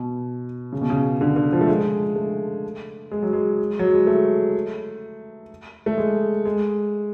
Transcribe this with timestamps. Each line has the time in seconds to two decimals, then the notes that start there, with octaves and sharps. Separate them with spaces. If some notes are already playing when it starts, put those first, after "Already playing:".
Already playing: B2
0.73 C#3
0.81 B2
0.90 C#3
1.21 D3
1.36 D3
1.52 F3
1.61 A3
1.68 G#3
2.16 A3
3.11 G#3
3.23 F#3
3.33 G#3
3.79 F#3
3.93 G#3
4.07 A3
5.86 A3
5.98 G#3
6.45 G#3